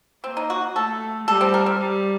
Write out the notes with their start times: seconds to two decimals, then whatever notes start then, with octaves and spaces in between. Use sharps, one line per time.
0.24 A#3 C4
0.37 D#4
0.50 F#4
0.75 A3 A4
1.28 G3 A4
1.41 C4
1.54 A#4
1.66 C4
1.79 G3